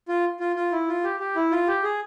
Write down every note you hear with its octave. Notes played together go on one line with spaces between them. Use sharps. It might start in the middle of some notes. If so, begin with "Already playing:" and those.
F4
F4
F4
E4
F4
G4
G4
E4
F4
G4
G#4